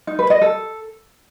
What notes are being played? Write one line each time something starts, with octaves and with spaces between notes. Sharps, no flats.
D#4
B4
D#5
A4